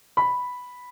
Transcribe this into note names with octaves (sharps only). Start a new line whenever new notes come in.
B5